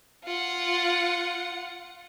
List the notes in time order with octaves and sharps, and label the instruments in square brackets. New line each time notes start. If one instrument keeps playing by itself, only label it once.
[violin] F4 F#5